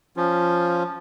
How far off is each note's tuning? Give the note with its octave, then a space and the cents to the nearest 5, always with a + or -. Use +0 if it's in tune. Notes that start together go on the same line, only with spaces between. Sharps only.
F3 +0 C#4 +0 F4 +0